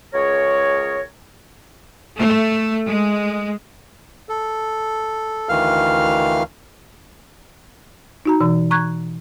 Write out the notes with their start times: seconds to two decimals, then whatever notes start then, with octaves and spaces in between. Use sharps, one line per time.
0.13 C#2 G#4 A#4 C#5
2.18 A3
2.86 G#3
4.29 A4
5.49 D2 D#3 E3 F5 F6
8.25 D#4 F#4 A#5
8.41 B2 E3
8.71 A#5 C#6 F#6 G#6